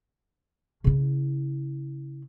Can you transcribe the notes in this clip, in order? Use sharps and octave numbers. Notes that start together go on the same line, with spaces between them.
C#3 E4